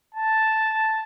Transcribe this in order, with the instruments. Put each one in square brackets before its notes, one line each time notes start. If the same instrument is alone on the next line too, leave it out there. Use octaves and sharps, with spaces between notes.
[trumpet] A5